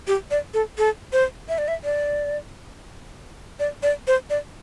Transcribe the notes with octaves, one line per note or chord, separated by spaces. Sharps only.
G4
D5
A4
A4
C5
E5
D5
E5
D5
D5
D5
C5
D5